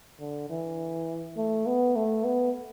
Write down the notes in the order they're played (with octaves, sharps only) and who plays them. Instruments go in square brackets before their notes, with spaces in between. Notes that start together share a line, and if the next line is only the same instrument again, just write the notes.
[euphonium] D3
E3
A3
B3
A3
B3